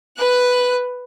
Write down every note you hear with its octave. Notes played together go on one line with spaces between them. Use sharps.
B4 F#6